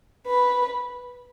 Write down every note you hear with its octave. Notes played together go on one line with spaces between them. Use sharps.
B4